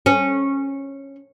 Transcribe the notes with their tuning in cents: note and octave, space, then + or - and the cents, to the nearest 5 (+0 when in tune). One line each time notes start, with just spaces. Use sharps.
C#4 -15